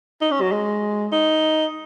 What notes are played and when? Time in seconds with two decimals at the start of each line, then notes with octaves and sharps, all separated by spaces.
0.21 D#4
0.31 C#4
0.41 F#3
0.52 G#3
1.12 D#4